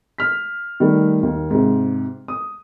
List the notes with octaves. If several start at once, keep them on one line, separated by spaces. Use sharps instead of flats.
F6 B6
D#3 G3 A3
D#2
G#2 C3
D#6